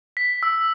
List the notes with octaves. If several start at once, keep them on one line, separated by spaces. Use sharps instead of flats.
B6
E6